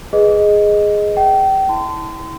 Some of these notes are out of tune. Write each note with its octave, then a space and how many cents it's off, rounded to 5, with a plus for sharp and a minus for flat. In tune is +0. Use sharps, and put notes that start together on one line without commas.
G#4 +0 B4 +0 D#5 +0
E5 +0 G5 -30
E4 -25 A5 +0 C6 -30